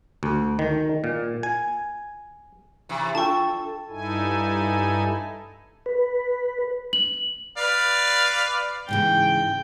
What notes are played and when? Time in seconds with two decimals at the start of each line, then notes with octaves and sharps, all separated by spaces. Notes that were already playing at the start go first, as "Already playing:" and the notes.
0.23 D2
0.59 D#3
1.04 A#2
1.43 G#5
2.89 C3 E3
3.15 D4 F4 A4 G5 A5 C#6
3.90 G2 D#4 E4 A4 G#5
5.86 B4
6.93 F#7
7.57 B4 D5 F5
8.89 G#2 C#3 E3 G5